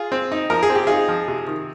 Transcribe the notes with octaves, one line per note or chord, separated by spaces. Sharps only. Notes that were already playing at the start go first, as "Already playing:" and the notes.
Already playing: F4 G#4
C4
D#4
F3 A#4
G#4
C4
G4
D#4 F4 G#4
F3
C3
D#3